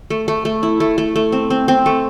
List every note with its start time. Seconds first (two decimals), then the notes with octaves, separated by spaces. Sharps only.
0.10 A3
0.28 A3
0.45 A3
0.63 E4
0.80 A3
0.98 A3
1.16 A3
1.32 C4
1.50 C4
1.68 C4
1.86 A3